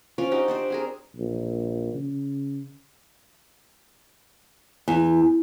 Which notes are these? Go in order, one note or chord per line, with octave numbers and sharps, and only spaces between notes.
F3 C#4 F5 D6
D4 D#4 F#4 G4
D4 C5 D5
C4 G#4 A#4
A#1
C#3
E2